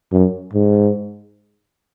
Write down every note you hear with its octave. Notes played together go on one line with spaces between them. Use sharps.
F#2
G#2